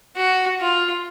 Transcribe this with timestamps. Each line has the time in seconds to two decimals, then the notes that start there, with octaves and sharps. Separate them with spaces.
0.16 F#4
0.61 F4